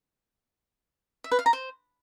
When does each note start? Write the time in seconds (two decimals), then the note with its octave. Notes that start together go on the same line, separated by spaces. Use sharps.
1.24 E5
1.31 B4
1.39 F5
1.46 A#5
1.53 C5